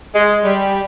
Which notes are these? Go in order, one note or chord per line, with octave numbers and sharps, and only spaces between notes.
G#3
G3